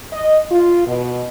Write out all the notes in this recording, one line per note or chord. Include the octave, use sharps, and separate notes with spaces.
D#5
F4
B2